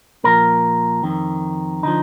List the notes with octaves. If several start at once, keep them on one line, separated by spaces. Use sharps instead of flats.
A#2 F3 A#4
F2 D#3
D3 F3 D#4